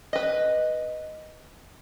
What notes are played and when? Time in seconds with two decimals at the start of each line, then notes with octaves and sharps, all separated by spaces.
0.13 B4 D#5